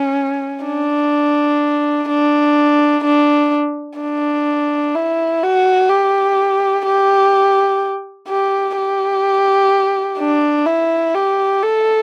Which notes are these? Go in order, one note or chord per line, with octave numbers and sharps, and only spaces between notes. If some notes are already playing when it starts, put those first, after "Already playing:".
Already playing: C#4
D4
D4
D4
D4
E4
F#4
G4
G4
G4
G4
D4
E4
G4
A4